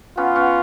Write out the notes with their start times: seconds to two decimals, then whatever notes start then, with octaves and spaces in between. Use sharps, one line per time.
0.17 B3 C#4 F4
0.36 B3 C#4